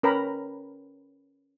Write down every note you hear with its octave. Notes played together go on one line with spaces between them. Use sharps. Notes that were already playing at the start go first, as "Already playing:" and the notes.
C#4 A#4 B4 G5 A#5 B5